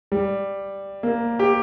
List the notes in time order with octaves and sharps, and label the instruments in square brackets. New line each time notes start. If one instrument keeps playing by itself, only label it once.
[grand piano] G3
A#3
G4